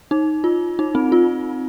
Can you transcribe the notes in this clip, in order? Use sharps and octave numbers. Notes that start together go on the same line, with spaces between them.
D#4
F4
D#4
C4
F4